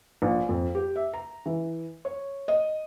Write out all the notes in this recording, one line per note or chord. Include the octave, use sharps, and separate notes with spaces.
A#1
F2
G4
E5
A#5
E3
C#5
D#5